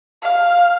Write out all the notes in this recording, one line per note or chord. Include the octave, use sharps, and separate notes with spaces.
F5